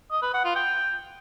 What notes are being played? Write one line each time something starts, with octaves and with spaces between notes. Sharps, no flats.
D#5
B4
F#5
F4
G5